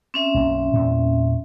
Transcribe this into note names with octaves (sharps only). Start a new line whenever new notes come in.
C4 C#4 E5
B1 F#2 A#3
E2 A#2